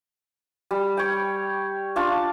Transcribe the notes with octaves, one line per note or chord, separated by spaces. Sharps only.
G3
C#5 G5
D4 F4 A5 C#6